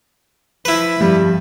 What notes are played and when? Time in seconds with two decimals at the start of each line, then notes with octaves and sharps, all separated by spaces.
0.65 F3 E4 B4 E5
1.01 G2 F3 G3 C4